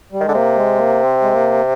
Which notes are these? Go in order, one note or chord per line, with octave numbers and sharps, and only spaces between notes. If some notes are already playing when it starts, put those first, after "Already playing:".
G3
D#3
D3 G#3
C3 A#3
G#3
A#3
C4
G#3
A#3